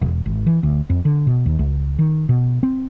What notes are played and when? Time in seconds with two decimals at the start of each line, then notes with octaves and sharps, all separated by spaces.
0.02 E1
0.26 G#1
0.46 E3
0.63 D2
0.90 F2
1.05 D3
1.27 B2
1.46 D#2
1.59 C#2
1.99 D#3
2.29 B2
2.63 C4